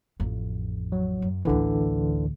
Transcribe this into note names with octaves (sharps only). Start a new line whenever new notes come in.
A1 F2
F#3
F#2
A1 D2 D3 E3